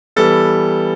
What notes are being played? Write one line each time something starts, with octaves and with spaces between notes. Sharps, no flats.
E3 G3 B3 A4